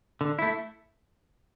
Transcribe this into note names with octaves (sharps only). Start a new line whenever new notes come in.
D3
A3 E4